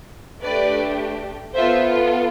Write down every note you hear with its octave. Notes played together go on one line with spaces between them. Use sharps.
A3 D4 G4 B4 D5
B3 F4 A4 C5 E5